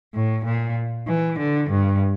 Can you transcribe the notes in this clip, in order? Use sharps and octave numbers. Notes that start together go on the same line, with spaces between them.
A2
A#2
E3
D3
G2